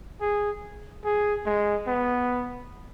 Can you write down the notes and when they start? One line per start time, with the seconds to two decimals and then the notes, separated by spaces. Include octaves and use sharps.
0.21 G#4
1.05 G#4
1.46 G#3
1.87 B3